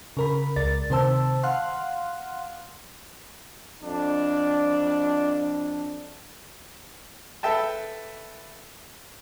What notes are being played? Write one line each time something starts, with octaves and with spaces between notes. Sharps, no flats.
C#3 A#4 B5
C#2 A#4 D5 A6
C3 D#3 C5 A5 E6
F5 F#5 C6 F6 F#6
F2 D4
A4 B4 E5 G5 A5